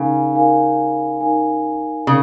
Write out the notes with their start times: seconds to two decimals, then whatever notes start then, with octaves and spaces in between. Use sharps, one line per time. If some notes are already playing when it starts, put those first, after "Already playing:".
Already playing: C#3 D#4 A#4 F5 G#5
0.33 D#4 A#4 F5 G#5
1.21 D#4 A#4 F5 G#5
2.07 C#3 D#4 A#4 F5